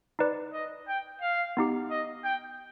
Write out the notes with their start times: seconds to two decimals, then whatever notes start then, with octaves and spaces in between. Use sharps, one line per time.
0.19 D#4 B4 D5
0.53 D#5
0.88 G5
1.21 F5
1.57 B3 D#4 G4
1.90 D#5
2.24 G5